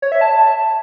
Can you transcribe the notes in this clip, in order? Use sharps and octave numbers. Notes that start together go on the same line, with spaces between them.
C#5
E5
A5